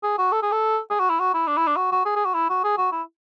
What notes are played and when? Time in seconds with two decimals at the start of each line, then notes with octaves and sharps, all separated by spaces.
0.03 G#4
0.18 F#4
0.32 A4
0.43 G#4
0.52 A4
0.90 G#4
1.00 F#4
1.10 E4
1.20 F#4
1.34 E4
1.47 D4
1.57 E4
1.67 D4
1.77 F#4
1.91 F#4
2.05 G#4
2.16 G#4
2.25 F#4
2.34 E4
2.50 F#4
2.64 G#4
2.78 F#4
2.92 E4